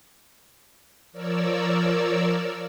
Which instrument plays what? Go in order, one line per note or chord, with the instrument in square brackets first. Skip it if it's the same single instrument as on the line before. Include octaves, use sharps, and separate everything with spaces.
[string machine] F3 A#4 C#5 D5 E6